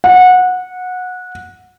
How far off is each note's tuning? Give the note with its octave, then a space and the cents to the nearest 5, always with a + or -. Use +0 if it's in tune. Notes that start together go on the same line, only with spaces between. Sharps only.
F#5 -20